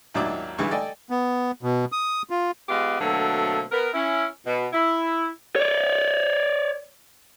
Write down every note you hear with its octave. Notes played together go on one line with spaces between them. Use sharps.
G#1 D#2 F#3 D4 E4 D6
B1 D3 E3 G3 G#3 C#6
A4 D5 D#5 G5 G#5
B3
B2
D#6
F4
G#3 B3 F4 G4 D#5
B2 D3 F#3 A3 A#3 C4
B3 A#4
C#4 E4
B2
E4
C#5 D5